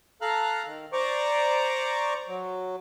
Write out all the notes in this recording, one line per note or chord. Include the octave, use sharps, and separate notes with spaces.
A4 F5 A#5 F6 F#6
D#3
C5 D5 A#5 C#6 D6
F#3